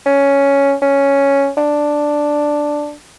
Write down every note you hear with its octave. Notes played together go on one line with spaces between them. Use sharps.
C#4
C#4
D4